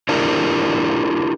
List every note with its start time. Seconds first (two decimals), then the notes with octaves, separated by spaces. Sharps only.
0.09 D4 E4 F4 G4 A#4 D5